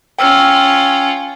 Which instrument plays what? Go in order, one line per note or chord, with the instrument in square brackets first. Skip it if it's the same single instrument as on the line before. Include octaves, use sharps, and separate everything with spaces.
[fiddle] C#4 F4 [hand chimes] G5 E6 F6